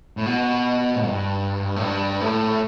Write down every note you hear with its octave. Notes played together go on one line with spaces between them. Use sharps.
A2
B2
A2
G2
A2
G2
A2